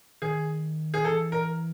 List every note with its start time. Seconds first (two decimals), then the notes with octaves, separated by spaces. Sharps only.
0.22 D#3 G#4
0.94 G#4
1.05 E3 A4
1.32 A#4